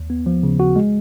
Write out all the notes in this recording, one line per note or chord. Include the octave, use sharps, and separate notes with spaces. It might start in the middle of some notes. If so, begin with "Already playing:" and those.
Already playing: D#2
B3
F3
C#3
F#4
G#3